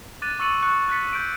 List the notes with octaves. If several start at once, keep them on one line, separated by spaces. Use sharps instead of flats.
D6 F#6 A6 D#7
C#6 E6 A6 C#7 D#7 F#7
C#6 F#6 C#7
F#6 A6 B6 C#7
C#6 G6 D7